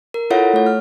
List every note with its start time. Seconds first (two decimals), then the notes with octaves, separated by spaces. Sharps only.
0.14 A#4
0.30 E4 F4 A4 C#5 E5 F#5
0.53 A3 C#5
0.66 F6